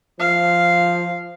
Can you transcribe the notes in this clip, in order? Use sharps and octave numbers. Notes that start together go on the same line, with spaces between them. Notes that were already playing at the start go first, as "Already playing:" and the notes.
F3 F5